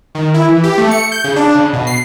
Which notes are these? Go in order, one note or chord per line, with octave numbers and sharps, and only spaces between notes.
D#3
E4
E3
G4
A3
C#7
G6
C#3
D4
C#3
B2
C7